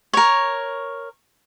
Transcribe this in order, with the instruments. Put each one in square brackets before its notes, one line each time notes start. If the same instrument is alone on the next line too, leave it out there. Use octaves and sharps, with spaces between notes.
[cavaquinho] A#4 C#5